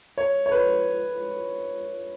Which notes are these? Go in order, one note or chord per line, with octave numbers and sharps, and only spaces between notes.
C#5
C#5
B4